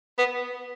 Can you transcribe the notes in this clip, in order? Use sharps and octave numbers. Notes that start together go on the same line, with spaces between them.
B3